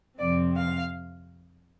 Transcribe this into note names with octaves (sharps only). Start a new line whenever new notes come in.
F2 C3 F3 C4 D5
F5